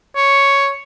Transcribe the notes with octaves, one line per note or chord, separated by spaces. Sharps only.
C#5